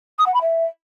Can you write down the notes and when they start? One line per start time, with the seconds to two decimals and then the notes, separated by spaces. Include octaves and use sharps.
0.19 D#6
0.26 F#5
0.34 B5
0.42 E5